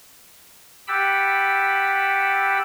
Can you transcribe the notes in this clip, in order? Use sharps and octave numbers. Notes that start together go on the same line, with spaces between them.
G4 F#5 G5 A5 B5 E6